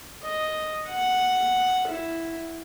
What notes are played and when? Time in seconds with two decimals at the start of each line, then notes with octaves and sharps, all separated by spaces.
0.23 D#5
0.87 F#5
1.88 E4